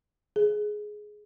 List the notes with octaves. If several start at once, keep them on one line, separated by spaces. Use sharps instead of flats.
G#4